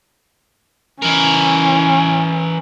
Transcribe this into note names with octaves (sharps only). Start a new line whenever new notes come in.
E3 C#4 A#4